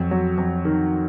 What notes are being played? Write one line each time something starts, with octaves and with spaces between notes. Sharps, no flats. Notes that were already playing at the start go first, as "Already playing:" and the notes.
Already playing: F2 F#3
F#3
F2
D#3